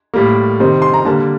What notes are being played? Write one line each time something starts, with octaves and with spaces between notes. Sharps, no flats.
A2 G3 A#3
C3 D#3 G3 C4
C6
A#5
D3 G3 A#3 A5